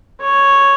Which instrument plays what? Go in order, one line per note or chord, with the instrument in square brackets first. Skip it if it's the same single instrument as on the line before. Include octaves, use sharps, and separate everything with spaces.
[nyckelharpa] C#5